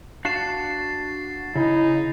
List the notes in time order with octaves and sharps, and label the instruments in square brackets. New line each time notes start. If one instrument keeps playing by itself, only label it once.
[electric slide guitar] D4 F#4 F5 [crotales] A6 C7 E7
[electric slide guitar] C#3 [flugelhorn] D#4 [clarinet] E4